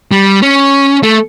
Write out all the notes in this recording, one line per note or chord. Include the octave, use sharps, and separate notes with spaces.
G3
C#4
A3